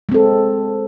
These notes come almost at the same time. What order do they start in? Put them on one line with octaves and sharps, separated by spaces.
G#3 C4 A4